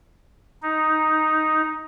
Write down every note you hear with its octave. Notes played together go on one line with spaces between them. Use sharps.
D#4